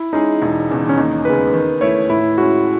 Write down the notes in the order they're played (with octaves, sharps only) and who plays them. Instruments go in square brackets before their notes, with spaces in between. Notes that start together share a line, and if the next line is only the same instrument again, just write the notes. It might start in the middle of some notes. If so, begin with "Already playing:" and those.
Already playing: [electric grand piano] E4
[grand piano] G#3 C#4 G#4 [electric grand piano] D#4
[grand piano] E1
E2 C#3
[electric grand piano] C#4
[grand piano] D#2 [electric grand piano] D#4
[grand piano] C#3 G#3 B3 [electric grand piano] B4
[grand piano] D#3
[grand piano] A3 E4 [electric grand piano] C#5
[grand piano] A2 [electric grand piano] E4
[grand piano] G#3 C#4 [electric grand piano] F#4